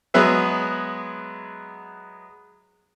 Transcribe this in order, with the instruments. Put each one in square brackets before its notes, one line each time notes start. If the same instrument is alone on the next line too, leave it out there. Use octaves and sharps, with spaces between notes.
[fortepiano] F#3 G#3 B3 G#4 B4 E5